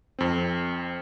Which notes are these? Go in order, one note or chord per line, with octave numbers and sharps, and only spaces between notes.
F2 C4